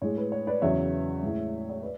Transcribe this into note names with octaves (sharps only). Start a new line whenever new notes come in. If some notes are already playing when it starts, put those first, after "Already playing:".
A2 G#3 C#5
B4
C#5
B4 D5
E2 C#3 F#3 C#5 E5
A2 G#3
C#5
B4 D5